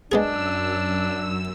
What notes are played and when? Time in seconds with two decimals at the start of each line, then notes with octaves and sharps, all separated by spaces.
0.12 F#2 G#3 B3 D4 G#4 E6